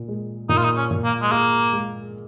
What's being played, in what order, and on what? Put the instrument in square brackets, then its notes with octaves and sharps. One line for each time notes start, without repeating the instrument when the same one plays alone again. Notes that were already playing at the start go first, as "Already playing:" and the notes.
Already playing: [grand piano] A#2
G#3
[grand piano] A#2 [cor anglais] D#4
[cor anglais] F4
D#4
C#4
[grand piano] A#2
[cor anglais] A#3
G#3
[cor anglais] A#3 [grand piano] G#4
[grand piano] G#3